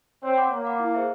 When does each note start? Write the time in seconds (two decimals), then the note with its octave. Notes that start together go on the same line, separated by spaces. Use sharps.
0.23 C4 C#5
0.36 F#5 B5 D6
0.51 A#3 C#5
0.65 F#5 B5 D6
0.80 E4
0.94 G#4 C5 E5